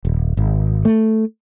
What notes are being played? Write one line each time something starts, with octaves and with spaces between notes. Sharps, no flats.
D#1
G#1
A3